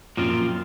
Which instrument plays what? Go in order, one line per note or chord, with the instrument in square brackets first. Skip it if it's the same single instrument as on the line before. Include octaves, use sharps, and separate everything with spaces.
[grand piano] F#2 [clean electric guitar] A#2 F3 C4 F4